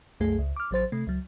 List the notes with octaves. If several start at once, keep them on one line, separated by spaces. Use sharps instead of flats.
C2 F#2 A3 G#4
C#2
D6 F6
A1 F#3 C5 A6
C3 A3
C#2 F#3